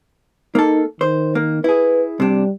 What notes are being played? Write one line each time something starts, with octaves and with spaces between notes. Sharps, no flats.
A#3 D#4 A4
D#3 C5
A#3
E4 G#4 B4
C3 G3 D4